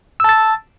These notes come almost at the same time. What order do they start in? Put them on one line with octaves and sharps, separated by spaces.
E6 A5 A6